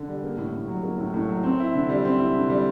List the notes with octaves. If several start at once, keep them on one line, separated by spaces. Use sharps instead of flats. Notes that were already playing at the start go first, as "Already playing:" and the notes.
Already playing: D3
G3
A#3
A2
A2
F#3
A#3
A2
A2
F#3
C4
E4
D3
G3
C4
E4
D3
G3